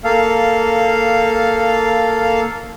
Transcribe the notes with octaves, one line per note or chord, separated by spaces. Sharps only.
A#3 A4 F5